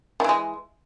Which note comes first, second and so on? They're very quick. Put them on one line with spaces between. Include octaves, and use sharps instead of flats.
D#3 E3 G#3